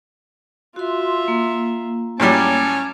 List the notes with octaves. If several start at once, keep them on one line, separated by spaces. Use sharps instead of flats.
F4 F#4 E5 C6
A#3
A2 F#3 G3 C#4 A5 D6